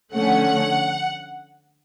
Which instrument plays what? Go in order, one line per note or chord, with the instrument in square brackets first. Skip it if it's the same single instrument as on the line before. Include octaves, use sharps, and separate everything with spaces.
[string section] D3 F3 A3 C#4 F#5